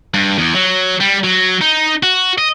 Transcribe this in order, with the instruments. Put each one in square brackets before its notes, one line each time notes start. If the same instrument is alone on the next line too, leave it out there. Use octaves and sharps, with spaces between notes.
[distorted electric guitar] G2
E2
F#3
G3
F#3
D#4
F#4
D#5